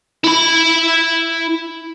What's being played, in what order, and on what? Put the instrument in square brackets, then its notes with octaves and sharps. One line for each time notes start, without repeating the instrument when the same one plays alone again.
[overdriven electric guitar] E4 B5